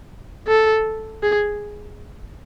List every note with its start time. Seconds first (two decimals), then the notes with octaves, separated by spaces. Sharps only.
0.48 A4
1.23 G#4